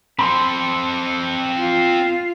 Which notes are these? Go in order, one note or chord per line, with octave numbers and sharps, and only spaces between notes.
C4 A4 B5 C6
F4